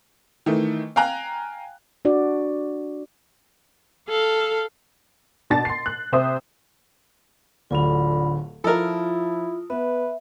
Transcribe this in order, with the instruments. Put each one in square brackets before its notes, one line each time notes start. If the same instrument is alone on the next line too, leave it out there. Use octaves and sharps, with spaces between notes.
[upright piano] D#3 E3 A3
F5 G5 G#5 A#5 F#6
[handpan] D4 F#4 D5
[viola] A4 F5
[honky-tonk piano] B2 D4 A5 A6
C6 C7
F#6
C3 C5 E5 D#6
[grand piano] D1 D2 F7 [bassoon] D3 [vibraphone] F4 B5
[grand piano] F3 [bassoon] E4 [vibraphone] F4 D#6 [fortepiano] A4 A#4
[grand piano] B3 [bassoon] B4 [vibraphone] E5